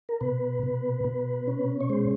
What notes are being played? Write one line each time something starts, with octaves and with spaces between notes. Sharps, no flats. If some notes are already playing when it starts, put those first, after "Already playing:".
A#4
B2 B4
B2
B2
C#4
C#5
G#3 C5